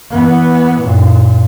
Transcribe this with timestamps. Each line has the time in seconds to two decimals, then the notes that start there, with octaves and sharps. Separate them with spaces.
0.11 E3 B3
0.80 F#2 A#2